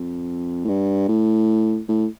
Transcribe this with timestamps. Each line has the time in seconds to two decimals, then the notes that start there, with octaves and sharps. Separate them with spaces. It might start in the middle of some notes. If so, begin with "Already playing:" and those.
Already playing: F2
0.65 A2
0.69 G2
1.09 A2
1.88 A2